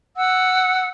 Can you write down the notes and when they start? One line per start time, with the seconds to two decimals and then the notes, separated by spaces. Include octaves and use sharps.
0.17 F#5 E6